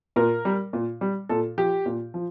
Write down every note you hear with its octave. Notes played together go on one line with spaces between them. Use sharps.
A#2 A#4
G3
A#2
G3
A#2 A4
F3 G4
A#2
F3